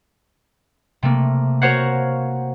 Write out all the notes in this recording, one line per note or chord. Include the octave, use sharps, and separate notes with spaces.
C3 A3 A#3
F#4 A#4 C5 C#5 F5 F#5